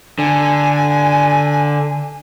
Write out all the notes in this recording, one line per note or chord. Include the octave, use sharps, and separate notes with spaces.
D3 G#5